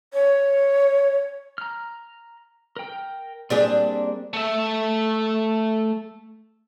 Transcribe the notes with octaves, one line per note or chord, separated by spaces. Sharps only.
C#5
A#5 F6
A#4 G5
G3 A#3 C4 D4 G4 G#4
A3 E5